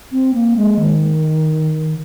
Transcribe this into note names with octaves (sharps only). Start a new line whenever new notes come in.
C4
A#3
G#3
D#3